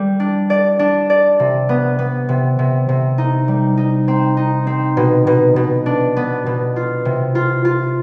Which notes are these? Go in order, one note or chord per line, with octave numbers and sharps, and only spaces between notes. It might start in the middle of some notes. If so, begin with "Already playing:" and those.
Already playing: G3
D4
D5
D4
D5
C3
B3
B3
C3
C3
C3
D#4
G3
D#4
C4
D#4
C4
B2
B2
B2
D4
B3
B2
F4
C3
F4
F4